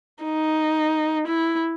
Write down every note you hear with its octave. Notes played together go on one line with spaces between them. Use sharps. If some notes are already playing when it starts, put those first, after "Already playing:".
D#4
E4